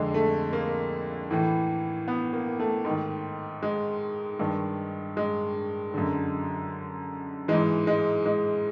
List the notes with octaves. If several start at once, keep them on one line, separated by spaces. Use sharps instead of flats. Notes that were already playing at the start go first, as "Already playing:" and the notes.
Already playing: F2 D3 G#3
A3
A#3
A2 E3
B3
A#3
A3
G#2 D#3
G#3
G2 D#3
G#3
F#2 D3
G#2 E3 G#3
G#3
G#3